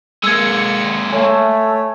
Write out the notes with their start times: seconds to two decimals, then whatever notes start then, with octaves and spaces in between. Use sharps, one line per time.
0.24 G#3 A#3 E6 G#6 C#7
1.12 A3 C#5 G#5